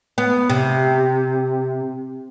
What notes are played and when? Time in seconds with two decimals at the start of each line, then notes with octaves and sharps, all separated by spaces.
0.18 B3
0.50 C3